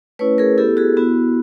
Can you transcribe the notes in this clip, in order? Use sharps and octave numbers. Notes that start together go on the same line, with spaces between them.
A3 C#4 E4 B4 C#5
G#4 A#4
B3 E4 G4 A4
F#4 G#4
B3 E4 F#4